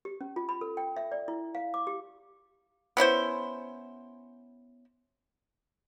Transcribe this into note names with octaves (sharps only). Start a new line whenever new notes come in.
G4
C#4
F4
B5
A4
G5
E5
D5
E4
F5
D6
G4
B3 C#4 E4 C5